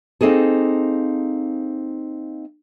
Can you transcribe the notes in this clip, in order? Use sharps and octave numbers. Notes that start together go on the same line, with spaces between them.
A#3 C4 D#4 G#4 A4